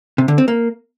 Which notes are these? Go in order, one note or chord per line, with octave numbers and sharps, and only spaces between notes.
C3
D3
C4
A#3